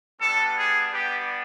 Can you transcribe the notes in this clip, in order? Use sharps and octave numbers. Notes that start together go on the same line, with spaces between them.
G3 B3 D4 A4
G#4
G3 B3 D4 G4